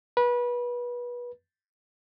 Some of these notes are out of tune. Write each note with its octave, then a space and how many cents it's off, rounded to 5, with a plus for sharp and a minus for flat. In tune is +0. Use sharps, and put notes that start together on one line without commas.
B4 -25